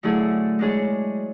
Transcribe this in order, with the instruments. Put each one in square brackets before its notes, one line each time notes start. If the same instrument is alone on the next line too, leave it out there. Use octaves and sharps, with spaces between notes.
[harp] D3 F#3 A3 E4 G#4
G#3 D4 G#4 C#5